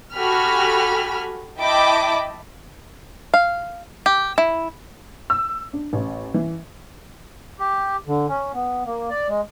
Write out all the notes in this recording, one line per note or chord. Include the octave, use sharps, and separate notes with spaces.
F#4 G4 A4 G#5 B5 F6
E4 D#5 G5 A5 B5 D6
F5
G4
E4
E6
D4
A1
E3
G4
D3
C#4
B3
A#3
D5
G#3